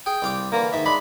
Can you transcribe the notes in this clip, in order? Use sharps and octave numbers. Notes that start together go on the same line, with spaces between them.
G#4 G5
C2 F5 D6
D3 E3 A#3
G#2 D#3 E5
G#3 D4 B5